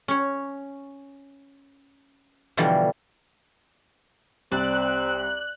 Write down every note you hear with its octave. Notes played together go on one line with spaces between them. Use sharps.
C#4 C#5
B2 D3 E3 F3 G3
C2 C4 D5 F#6